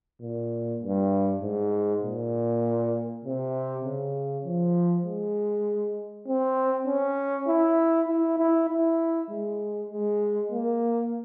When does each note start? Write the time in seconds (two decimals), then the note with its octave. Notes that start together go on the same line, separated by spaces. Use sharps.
0.22 A#2
0.82 G2
1.42 G#2
2.03 A#2
3.25 C3
3.85 C#3
4.44 F3
5.05 G#3
6.27 C4
6.87 C#4
7.48 E4
8.08 E4
8.38 E4
8.69 E4
9.30 G#3
9.90 G#3
10.51 A#3